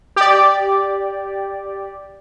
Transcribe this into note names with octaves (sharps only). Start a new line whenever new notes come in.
G4 D5